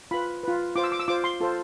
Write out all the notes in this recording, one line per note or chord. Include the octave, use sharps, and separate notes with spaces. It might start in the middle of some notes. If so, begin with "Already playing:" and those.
F4 B4 B5
F4 B4
F4 C5 D6
E6
D6
E6
F4 C5 D6
C6
F4 A4 C5